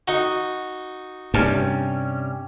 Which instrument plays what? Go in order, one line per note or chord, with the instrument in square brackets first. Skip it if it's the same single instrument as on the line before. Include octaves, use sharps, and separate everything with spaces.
[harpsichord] D#4 F#4
[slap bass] G2 [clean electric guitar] C3 G3 C#4